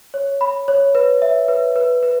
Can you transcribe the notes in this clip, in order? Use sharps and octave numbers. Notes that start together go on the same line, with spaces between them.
C#5
B5
C#5
B4
E5
B4
B4
B4